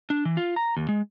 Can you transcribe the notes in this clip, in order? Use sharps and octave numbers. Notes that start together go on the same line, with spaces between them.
D4
E3
F4
A#5
D#2
G#3